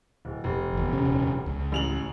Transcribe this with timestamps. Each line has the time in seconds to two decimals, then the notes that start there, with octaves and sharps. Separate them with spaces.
0.25 D1
0.44 F1
0.73 G1 E2
0.93 D#1 C3 C#4
1.46 C#2
1.72 A1 F7 F#7